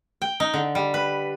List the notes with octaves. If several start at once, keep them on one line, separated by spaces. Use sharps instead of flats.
G5
D#4
D3
G3
B4